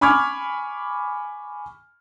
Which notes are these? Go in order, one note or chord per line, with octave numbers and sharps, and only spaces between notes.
G#5 B5 C#6 D6 F6 G#6